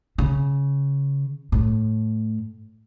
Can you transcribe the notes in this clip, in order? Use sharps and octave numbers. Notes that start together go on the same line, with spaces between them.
C#3
A2